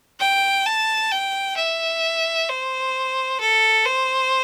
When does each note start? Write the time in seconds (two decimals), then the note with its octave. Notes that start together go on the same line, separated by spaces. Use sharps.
0.20 G5
0.66 A5
1.11 G5
1.57 E5
2.49 C5
3.40 A4
3.86 C5